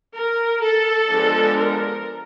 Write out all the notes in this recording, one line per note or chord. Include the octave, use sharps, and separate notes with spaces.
A#4
A4
F3 G#3 B3 D4
A#4